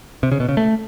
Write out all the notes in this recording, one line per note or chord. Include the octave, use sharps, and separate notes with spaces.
C3
C#3
B2
C#3
A3